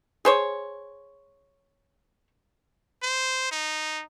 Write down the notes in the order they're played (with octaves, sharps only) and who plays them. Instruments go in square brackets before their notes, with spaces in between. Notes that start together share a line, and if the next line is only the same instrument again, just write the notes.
[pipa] G#4 C5 C#5
[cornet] C5
D#4